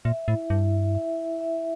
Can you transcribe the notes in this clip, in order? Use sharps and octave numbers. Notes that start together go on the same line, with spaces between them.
A#2 E5
A2 E4
G2 E4
E5
E5
E4
E5